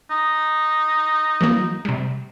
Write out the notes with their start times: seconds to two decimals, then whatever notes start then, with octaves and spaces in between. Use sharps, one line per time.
0.10 D#4
1.41 E3 F#3 A#3
1.85 C3 G3